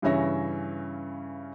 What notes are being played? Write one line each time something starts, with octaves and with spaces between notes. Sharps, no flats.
G2 C#3 E3 C#4 E5 A#6